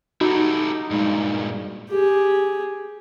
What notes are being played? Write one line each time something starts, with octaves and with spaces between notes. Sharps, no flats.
D#4 E4 F#4 G4 A4
G2 A#2 G#3
G4 G#4